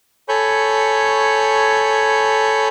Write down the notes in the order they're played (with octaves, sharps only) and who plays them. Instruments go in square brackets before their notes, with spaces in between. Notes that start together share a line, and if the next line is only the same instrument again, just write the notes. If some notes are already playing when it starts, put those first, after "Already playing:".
[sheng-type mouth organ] A4 C#5 G#5 B5 C#6 G6